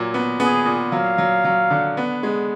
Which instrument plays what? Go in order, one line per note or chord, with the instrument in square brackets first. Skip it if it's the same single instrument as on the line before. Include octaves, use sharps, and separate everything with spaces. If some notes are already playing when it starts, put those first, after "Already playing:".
Already playing: [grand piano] A#2 F#3
B3
[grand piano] B3 [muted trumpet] G#4
[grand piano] A#2
[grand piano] F#3 [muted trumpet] F5
[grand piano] F#3
F#3
D3
B3
G#3